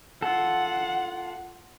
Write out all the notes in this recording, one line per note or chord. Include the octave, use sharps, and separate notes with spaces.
F4 A4 F#5